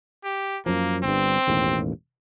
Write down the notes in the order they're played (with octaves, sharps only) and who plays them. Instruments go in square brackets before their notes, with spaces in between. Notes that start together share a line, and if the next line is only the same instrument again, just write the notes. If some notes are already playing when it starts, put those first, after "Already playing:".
[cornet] G4
[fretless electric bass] F#2 F3 [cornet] A#3
[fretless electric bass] G1 G2 [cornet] C4
[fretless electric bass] E1 A1 D#2